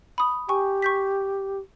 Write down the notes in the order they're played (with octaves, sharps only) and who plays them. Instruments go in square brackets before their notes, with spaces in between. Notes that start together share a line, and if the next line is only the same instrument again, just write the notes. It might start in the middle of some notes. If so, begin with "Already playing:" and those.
[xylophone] B5 D#6
[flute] G4 [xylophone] G5 G#5 C#6
[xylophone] C#6 G6 B6